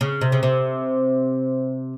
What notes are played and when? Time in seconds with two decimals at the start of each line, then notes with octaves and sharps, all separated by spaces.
0.01 C#3
0.21 C3
0.32 C#3
0.43 C3